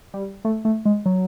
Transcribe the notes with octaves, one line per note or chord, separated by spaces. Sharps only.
G3
A3
A3
G#3
F#3